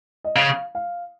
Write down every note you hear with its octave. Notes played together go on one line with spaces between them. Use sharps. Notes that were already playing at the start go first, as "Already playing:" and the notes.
D#5
C#3 F5
F5